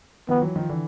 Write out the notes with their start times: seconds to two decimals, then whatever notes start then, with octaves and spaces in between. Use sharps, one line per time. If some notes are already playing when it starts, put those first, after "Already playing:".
0.29 D#3 F3 B3
0.42 E3 F#3
0.56 D#3 F3
0.69 D3 E3